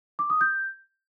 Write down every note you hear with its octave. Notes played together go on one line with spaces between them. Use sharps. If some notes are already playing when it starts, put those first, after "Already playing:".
D6
D#6
G6